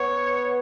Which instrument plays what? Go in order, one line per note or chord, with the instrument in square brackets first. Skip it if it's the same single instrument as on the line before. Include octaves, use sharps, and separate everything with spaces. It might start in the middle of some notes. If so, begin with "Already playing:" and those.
Already playing: [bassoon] B3 [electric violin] C#5